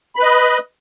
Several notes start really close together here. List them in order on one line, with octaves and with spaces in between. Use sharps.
B5 B4 D#5